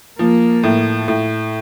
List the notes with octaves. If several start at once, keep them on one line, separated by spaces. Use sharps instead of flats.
F3 A#3
A2
A2